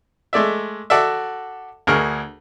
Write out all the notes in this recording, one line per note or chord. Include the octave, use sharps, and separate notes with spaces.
G#3 A3 D5 E5
F#4 A4 D5 E5
D2 G#4 A#4 C#6 F6